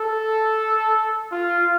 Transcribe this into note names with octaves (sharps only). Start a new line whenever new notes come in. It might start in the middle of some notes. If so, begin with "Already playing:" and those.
Already playing: A4
F4